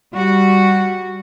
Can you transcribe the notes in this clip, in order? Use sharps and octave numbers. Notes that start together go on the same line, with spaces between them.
G3 F#4